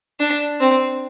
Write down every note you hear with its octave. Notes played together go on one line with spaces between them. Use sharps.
D4
C4